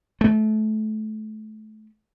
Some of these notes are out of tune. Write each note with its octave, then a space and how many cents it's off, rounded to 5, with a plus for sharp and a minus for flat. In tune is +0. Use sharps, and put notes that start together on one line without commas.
A3 -25